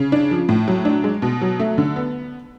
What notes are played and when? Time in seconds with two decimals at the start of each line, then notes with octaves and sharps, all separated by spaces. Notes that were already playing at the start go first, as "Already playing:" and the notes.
Already playing: C#3
0.12 D4
0.31 F3
0.49 A2
0.68 F#3
0.85 D4
1.04 G#3
1.22 B2
1.41 F#3
1.60 A3
1.78 D3
1.96 B3